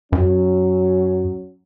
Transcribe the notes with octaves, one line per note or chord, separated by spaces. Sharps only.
F#2 F#3 C#4